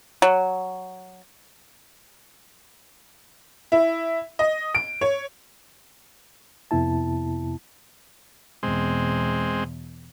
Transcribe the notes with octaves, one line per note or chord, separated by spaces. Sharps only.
F#3
E4
D#5
D7
C#5
F2 C3 B3 E4 A5
E2 B2 G#3 C4